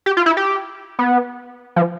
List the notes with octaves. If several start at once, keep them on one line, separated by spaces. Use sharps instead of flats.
G4
F4
E4
G4
B3
F3